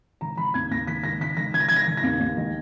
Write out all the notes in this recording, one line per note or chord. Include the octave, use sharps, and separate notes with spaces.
D#3 A#5
D#3 B5
D#2 G#6
D#2 A#6
D#3 B6
D#3 A#6
D#3 B6
D#3 A#6
D#3 G#6
A#6
D#3 G#6
A#6
D#3
A#6
D#2
D#2
D#3